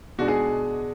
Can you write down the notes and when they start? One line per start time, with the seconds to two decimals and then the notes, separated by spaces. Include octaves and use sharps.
0.18 B2 G#3 D4 F#4
0.28 G#4